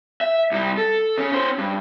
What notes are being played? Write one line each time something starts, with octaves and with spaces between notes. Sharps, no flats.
E5
C2 G3
A4
C#3 C#4
C#4 C5
G2